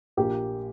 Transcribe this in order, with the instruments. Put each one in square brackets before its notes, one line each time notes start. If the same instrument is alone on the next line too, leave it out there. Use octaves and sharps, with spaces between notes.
[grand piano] A#1 A#2 A#3 [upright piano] G4